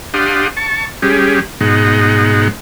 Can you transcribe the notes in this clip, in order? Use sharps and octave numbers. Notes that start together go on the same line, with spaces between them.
D4 G4 F5 F#5 C6 D#6
A5 C#6
G3 G#3 C#4 G4 G#4
G#2 B2 G#3 D#4 F#5